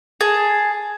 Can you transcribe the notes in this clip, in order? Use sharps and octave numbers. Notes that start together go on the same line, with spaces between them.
G#4 A5